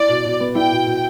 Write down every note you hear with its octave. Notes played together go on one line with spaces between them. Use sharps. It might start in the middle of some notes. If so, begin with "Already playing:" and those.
Already playing: E4 D5
B2
B2
B3
E4 G5
B2
B2